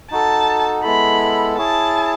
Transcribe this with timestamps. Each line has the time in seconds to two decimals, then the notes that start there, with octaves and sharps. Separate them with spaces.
0.10 D#4 F#4 A4 A5
0.84 G#3 B3 E4 A4 B5
1.57 E4 G#4 C#5 A5